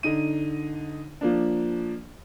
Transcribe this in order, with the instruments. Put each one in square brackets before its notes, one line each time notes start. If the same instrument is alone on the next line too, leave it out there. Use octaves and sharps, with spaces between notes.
[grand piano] D3 D#4 D#7
F3 A#3 D4